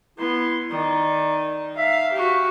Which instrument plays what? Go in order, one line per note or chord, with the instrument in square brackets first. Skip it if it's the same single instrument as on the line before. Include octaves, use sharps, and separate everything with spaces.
[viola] B3 C6 [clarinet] E4
[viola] D#3 D#4 [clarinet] D5
[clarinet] E5 [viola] F5
[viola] F#4 G4